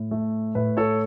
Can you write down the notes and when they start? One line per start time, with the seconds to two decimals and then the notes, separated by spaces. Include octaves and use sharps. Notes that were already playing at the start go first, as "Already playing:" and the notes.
Already playing: A2
0.11 A3
0.55 A2 B4
0.77 A4 C#5